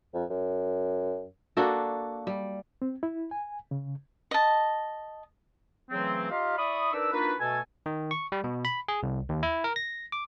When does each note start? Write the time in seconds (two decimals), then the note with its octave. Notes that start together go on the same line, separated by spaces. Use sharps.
0.14 F2
0.30 F#2
1.57 A#3 D4 F#4 A4
2.27 G3
2.82 C4
3.03 E4
3.31 G#5
3.71 C#3
4.31 D#5 A5
5.90 C#3 E3 F#3 A3 C4
6.30 D#4 F4 G4 D#5 F5
6.57 E4 D5 B5 C#6 D#6
6.92 D4 D#4 A#4 B4 D5 E6
7.13 A#3 D4 D#4 F4 F#4 B4
7.39 B2 A3 A4 G#5
7.86 D#3
8.11 C#6
8.32 G3
8.44 B2
8.65 B5
8.88 G#4
9.03 C2
9.29 D#2
9.43 E4
9.64 A#4
9.76 A#6
10.12 D6